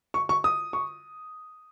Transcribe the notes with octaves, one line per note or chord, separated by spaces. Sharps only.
C#6
C#6
D#6
C#6